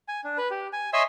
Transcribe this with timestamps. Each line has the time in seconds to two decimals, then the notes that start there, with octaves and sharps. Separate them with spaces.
0.08 G#5
0.24 D4
0.38 B4
0.51 G4
0.73 G#5
0.93 C#5 D#5 E5 G#5 C6 E6